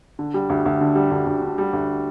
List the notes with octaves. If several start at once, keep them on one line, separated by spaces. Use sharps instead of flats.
D3
G3
D2
D2
D3
G3
D2
D2
D3
G3
D2